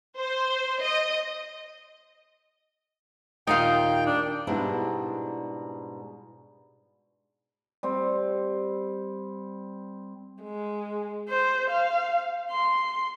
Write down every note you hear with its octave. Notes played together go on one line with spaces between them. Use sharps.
C5
D#5
D#2 A#2 D#4 F5 G5
D4
G#2 B2 G3 D4 E4
G3 C4
G#3
C5
F5
C6